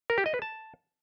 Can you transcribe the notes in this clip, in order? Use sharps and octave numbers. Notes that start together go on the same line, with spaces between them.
A#4
G4
D#5
B4
A5